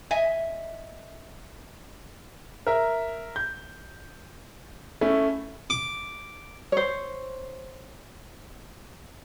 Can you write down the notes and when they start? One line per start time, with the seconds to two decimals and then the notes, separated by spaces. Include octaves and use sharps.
0.11 D#5 E5 G#5
2.67 A#4 E5
3.36 G6
5.01 A3 C#4 E4
5.70 D6
6.72 C5 C#5